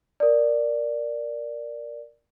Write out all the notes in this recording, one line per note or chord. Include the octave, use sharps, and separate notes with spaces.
A#4 D5